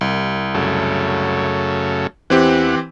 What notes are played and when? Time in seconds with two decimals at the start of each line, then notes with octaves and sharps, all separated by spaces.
0.01 C2
0.54 F#2 C#3 A3
2.30 E2 E3 C4 G4 F#5